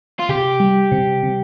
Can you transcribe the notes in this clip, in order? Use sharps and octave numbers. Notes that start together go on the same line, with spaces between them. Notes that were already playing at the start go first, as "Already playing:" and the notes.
F4
C3 G4
G3
C3
C3